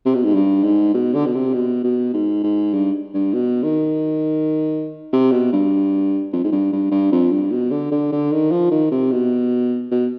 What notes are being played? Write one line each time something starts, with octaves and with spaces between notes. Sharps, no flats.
C3
B2
G#2
G2
G#2
B2
D3
B2
C3
B2
B2
G#2
G#2
G2
G2
B2
D#3
C3
B2
G2
F2
G#2
G2
G2
G2
F2
G2
B2
D3
D3
D3
D#3
F3
D#3
C3
B2
B2